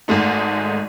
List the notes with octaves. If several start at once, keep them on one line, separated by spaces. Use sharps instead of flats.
G#1 G#2 G#3 A3 D#4